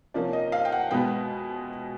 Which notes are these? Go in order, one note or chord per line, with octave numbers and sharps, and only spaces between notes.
C3 F3 A#3 C#4 D5
D#5
F5
G5
F#5
B2 G#3 B3 G5